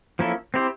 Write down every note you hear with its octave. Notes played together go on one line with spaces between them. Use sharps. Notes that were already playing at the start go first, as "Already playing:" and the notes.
F3 A#3 C#4 E4 A4
C4 E4 G4 C5